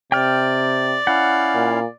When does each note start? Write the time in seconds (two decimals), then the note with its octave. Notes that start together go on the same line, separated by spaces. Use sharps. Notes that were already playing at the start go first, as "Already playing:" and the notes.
0.12 C3 D5 G5 F6
1.07 C#4 E4 F5 F#5
1.55 A#2